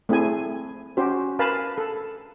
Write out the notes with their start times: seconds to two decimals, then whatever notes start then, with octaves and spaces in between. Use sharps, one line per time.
0.09 A3 C4 E4 G#4 G#5
0.97 C#4 F#4 G4 C5
1.39 A#4 B4 F5 G#5 A5 B5
1.78 A4